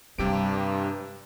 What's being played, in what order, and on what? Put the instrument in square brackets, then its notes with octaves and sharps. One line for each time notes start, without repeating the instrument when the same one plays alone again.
[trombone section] G2 [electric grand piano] C3 G4 D7 [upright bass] G3